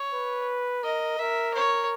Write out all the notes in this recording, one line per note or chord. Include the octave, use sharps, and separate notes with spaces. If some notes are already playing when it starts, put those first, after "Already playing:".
Already playing: C#5
B4
A#4 D#5
A#4 E5
C#5